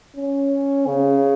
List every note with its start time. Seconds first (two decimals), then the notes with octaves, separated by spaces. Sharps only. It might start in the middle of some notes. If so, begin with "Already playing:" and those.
0.16 C#4
0.87 C#3